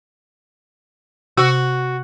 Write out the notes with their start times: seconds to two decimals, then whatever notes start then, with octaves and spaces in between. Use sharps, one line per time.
1.37 C3 F#4